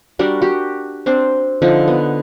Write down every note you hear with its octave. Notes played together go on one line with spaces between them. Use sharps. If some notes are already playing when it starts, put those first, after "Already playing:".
G3 D4 F#4 A#4
F#4 G4
C4 D4 C5
D3 F3 D#4
B3